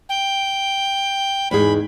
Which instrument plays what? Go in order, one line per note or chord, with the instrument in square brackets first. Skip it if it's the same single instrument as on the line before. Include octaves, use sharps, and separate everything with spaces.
[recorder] G5
[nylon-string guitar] E2 G#2 G#4 [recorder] B5